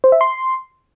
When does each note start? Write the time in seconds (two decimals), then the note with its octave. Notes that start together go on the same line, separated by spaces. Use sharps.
0.04 C5
0.12 E5
0.21 C6